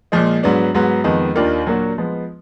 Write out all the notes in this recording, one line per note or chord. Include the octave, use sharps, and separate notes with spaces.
A#2 F3 G#3
G#2 F#3 B3 D4
G#2 F#3 B3
F2 D#3 G#3 B3
D#2 D#3 A#3 D4 F4
A#2 F#3 A#3 D4 F#4
F3 G#3 B3